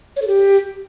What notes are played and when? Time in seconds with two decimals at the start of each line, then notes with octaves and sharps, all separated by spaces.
0.16 C#5
0.22 A4
0.27 G4